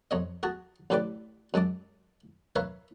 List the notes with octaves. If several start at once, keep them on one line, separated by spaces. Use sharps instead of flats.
F2 C#5 D#5
F#4 G#4 A5
A1 A2 G4 B4 D5 D6
F#2 G#3 A5 D6
A#4 B4 C#5 E5 F5